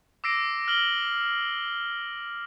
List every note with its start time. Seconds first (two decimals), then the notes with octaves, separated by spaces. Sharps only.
0.24 D6 E6 A#6 C7 D7
0.68 F6 F#7 G7